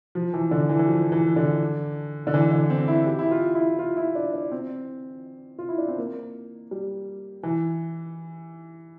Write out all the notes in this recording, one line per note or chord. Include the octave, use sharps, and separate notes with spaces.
F3
E3
D3
E3
E3
F3
E3
D3
D3
E3
D3
C4
E4
G4
E4
F4
E4
F4
E4
D4
D4
C4
F4
E4
D4
C4
A#3
G3
E3